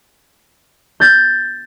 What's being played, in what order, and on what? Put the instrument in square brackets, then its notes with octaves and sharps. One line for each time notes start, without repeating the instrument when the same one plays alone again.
[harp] G6 A6